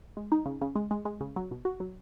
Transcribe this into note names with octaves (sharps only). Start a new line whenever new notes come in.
G#3
D#4
C#3
C#3
G#3
G#3
G#3
C#3
F#3
B2
F#4
F#3